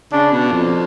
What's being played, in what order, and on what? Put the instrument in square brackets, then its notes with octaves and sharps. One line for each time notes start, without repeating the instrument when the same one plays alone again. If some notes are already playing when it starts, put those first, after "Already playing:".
[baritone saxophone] C#3 [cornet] D4
[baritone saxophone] B2
F2